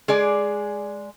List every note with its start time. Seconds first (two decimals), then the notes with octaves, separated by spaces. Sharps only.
0.08 G#3 G#4 D5